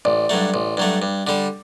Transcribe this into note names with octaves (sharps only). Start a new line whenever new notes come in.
A1 D5
G2 F#3 A3
A1
G2 F#3 A3
G2
D3 G3